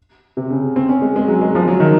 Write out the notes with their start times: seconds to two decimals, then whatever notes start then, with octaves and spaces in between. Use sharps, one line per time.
0.37 C3
0.50 C#3
0.76 C4
0.89 C#4
1.02 G#3
1.16 G#3
1.28 F#3
1.41 G#3
1.55 F3
1.68 F#3
1.80 D#3